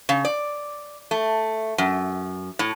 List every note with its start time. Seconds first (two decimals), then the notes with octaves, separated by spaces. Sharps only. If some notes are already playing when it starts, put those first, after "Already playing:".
0.09 C#3
0.25 D5
1.11 A3
1.78 F#2
2.59 A2